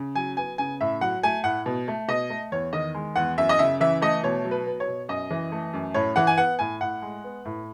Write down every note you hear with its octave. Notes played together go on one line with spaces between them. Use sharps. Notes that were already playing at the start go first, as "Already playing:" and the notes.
Already playing: C#3
F#3 G#5
B3 G#5
C#3 G#5
A2 E5
F#3 F#5
A3 G#5
A2 F#5
B2
A3
B2 D#5
A3
E2 C#5
D#3 D#5
G#3
E2 F#5
F#2 E5
D#5
C#3 E5
E3 E5
A3 D#5
B2 C#5
F#3
B4
B3
C#5
B2
F#2 D#5
E3
A3
F#2
A2 C#5
E3 F#5
G#5
B3 F#5
A2 G#5
A2 F#5
G#3
B3
A2